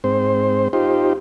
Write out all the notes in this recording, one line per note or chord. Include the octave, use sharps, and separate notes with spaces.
G#2 C4 C5
D#4 F4 G4 C5